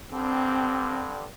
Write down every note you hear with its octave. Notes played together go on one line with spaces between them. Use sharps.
G2 D3 G3 C4